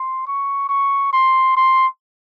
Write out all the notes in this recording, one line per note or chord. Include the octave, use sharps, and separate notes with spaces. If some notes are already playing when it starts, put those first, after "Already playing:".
Already playing: C6
C#6
C#6
C6
C6